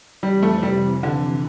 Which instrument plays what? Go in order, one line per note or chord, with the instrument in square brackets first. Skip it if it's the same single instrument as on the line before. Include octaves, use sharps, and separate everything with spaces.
[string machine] F2 C3 E3 [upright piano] G3
[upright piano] A3
G3
D3